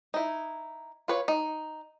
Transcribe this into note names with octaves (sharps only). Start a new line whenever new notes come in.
D#4 E4
F4 B4 C#5
D#4